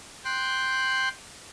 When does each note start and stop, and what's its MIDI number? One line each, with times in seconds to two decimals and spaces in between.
0.24 1.09 79
0.24 1.09 84
0.24 1.09 90